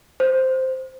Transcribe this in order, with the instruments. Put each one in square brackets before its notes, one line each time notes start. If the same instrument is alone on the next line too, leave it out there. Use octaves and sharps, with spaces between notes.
[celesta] C5